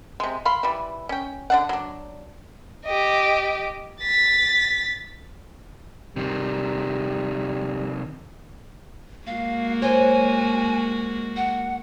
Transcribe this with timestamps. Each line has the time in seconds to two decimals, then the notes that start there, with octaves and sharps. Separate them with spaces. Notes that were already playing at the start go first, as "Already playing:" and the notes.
0.20 C3 G#3
0.45 F5 B5 C6
0.63 E3 G3
1.09 C#4 G5
1.50 D3 D4 F#5
1.69 F#3 D4
2.85 G4 D#5
4.01 A6 B6
6.16 C3 D#3 G3
9.27 G#3 A#3 F#4 F5
9.82 C5 C#5 G#5
11.36 F#5